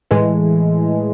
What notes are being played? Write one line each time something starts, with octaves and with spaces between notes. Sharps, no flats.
A2 E3 G#3